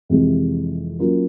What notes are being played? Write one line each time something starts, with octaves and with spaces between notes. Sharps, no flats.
F2 C3 E3 G#3
F#3 A#3 C#4 F4 A#4